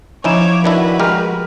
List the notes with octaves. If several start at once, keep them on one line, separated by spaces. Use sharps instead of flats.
F3 C#4 D#4 E4 C#5 D6 D7 E7
D#3 D4 E4 F#4 B4
G#3 G4 A#4 F6